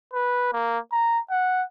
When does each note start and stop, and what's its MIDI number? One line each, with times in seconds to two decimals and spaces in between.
0.13 0.49 71
0.53 0.79 58
0.92 1.19 82
1.30 1.63 78